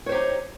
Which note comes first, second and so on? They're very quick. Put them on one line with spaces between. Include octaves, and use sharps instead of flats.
C#5 C5 G4 D#4